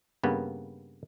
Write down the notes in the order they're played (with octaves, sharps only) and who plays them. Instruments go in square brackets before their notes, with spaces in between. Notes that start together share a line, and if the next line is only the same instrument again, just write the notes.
[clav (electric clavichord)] G2 C#3 A#3 B3